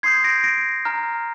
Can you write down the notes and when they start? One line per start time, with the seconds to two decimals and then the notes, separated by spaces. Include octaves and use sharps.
0.03 C6 D#6 G6 G#6 C7
0.24 A#6 D7
0.44 A#6 D7
0.85 A#5 F6